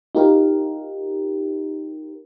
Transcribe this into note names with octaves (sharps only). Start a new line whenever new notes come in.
D#4 F4 G4 A#4